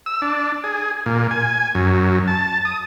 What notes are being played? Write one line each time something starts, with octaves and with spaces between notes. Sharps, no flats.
E6
D4
G#4
A#2
G#5
F#2
A5
D#6